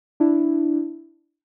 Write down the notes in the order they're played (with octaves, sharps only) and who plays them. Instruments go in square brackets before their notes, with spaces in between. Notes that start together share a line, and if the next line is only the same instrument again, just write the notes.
[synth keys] D4 E4